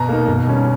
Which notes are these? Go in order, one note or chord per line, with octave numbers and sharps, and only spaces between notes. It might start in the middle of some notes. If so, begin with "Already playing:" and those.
Already playing: B2 A#5
A#3 D#4
B2
G3 C#4